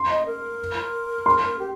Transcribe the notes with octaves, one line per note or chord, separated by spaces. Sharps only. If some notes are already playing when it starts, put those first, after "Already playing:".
Already playing: C6
D#5
A#4
C6
G4